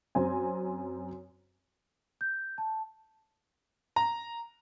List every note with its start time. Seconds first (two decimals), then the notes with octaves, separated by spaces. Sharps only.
0.15 F#2 C4 G#5
2.21 G6
2.58 A5
3.96 A#5